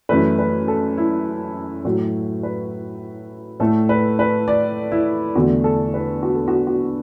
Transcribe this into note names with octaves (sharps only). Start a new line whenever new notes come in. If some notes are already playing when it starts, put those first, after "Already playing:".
F#2 E3 A3 B4
B4
A4
E4
A2 F#3 A3 F#4
B4
A2 A3 A4
B4
B4
D5
E4
E2 D3 A3 F#4
A4
B4
F#4
A4
F#4
F#4